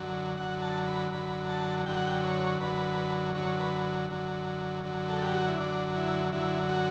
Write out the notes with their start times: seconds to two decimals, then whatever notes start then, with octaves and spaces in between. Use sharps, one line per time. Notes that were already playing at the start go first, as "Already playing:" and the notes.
Already playing: F#2 D3 F#3
0.37 F#2 D3 F#3 F#5
0.62 A5
0.86 B5
1.11 F#2 D3 F#3 B5
1.49 A5
1.86 F#2 D3 F#3 G5
1.97 F#5
2.07 G5
2.24 C#5
2.61 F#2 D3 F#3 B4
3.35 F#2 D3 F#3 C#5
3.60 B4
4.10 F#2 D3 F#3
4.83 F#2 D3 F#3
5.09 A4
5.22 G4
5.34 F#4
5.47 E4
5.58 F#2 D3 F#3 D4
5.96 E4
6.32 F#2 D3 F#3 E4
6.69 F#4